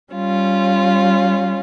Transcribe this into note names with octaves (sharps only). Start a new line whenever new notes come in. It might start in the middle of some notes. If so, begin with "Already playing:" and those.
G3 C#4 F4